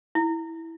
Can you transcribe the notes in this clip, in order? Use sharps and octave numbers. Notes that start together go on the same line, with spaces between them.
E4